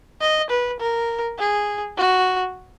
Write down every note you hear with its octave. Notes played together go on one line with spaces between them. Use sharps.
D#5
B4
A#4
G#4
F#4